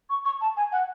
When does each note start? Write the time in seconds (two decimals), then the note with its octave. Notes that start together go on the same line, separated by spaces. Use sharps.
0.10 C#6
0.25 C#6
0.41 A5
0.57 G#5
0.72 F#5